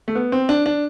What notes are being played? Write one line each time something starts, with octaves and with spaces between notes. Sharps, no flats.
A3
B3
C4
D4
D4